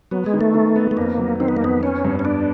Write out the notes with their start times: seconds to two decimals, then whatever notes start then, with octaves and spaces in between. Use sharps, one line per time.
0.11 F#3 B3
0.26 G#3
0.33 D#3
0.41 A3
0.54 D#3
0.76 B3
0.91 A3
0.97 F2 A#3
1.18 F#3
1.40 D#3 C4
1.48 B3
1.57 A#3
1.61 F2 B3
1.83 B3 C#4
2.05 G2
2.19 C#4
2.25 B3 D4